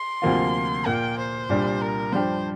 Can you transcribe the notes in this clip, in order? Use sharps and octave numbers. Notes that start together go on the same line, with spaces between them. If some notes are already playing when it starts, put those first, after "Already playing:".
Already playing: C6
D2 C3 F3 A#3 F4
A#2 A#3 F4 G5
C5
C2 A#2 G3 D4
A#4
G2 F3 D4 G4 C5